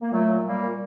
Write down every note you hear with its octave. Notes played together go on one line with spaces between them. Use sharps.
A#3
A#2 F#3 A3
A#2
A#2 G3 A#3
A#2